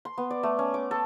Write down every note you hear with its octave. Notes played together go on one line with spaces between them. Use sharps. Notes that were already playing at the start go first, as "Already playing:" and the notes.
C6
B3
D5
A3
C#4
D6
A4